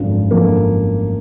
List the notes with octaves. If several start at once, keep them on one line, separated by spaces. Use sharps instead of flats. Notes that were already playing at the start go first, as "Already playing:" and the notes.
Already playing: G#1 F#2 D3 F3
G#1 F#2 D3 F3 A#3